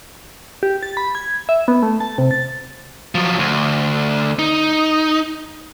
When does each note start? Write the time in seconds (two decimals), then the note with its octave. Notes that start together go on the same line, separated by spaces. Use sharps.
0.63 G4
0.83 A6
0.97 B5
1.15 G#6
1.49 E5
1.68 B3
1.83 A3
2.00 A5
2.18 C3
2.31 A6
3.15 F3 F#3
3.39 D2
4.39 D#4